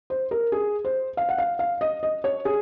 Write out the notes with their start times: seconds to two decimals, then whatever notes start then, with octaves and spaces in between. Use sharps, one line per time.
0.10 C5
0.31 A#4
0.52 G#4
0.85 C5
1.17 F5
1.29 F#5
1.38 F5
1.59 F5
1.81 D#5
2.03 D#5
2.24 C#5
2.45 G#4